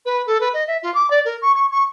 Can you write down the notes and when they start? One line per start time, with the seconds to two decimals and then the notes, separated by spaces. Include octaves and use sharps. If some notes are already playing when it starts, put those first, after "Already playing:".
0.05 B4
0.26 A4
0.40 B4
0.54 D#5
0.67 E5
0.82 F4
0.94 D6
1.10 D5
1.25 A#4
1.42 C#6
1.55 C#6
1.71 C#6